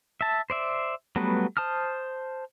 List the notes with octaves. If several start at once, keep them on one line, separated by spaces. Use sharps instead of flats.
E5 A5
C5 D5 E5
F#3 G3 A3 B3 B4
C5 A5 D#6 F6